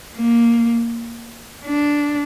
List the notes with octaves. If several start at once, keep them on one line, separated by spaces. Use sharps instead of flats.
A#3
D4